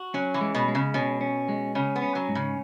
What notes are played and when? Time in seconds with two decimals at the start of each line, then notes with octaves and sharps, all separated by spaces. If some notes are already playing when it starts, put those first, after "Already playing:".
Already playing: F#4
0.14 F#3 C#4
0.34 E3
0.41 G#3
0.55 B2
0.68 G#3
0.75 C#3
0.94 B2 C#4
1.21 C#4
1.49 G#3
1.75 C#3 C#4
1.96 B3
2.02 C#4
2.15 F#3
2.29 G#2
2.35 C#3